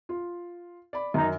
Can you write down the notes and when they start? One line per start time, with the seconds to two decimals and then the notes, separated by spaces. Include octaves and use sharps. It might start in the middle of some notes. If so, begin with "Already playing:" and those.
0.09 F4
0.93 D5 B5
1.14 F#2 D#3 D#4